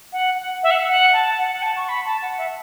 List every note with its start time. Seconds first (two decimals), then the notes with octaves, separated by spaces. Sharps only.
0.12 F#5
0.38 F#5
0.63 E5
0.71 F#5
0.88 F#5
1.13 A5
1.38 F#5
1.51 F#5
1.63 A5
1.76 C#6
1.89 B5
2.05 A5
2.22 F#5
2.38 E5